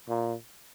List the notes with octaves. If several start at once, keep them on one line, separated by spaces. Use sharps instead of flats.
A#2